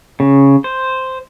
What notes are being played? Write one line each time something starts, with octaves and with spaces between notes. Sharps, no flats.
C#3
C5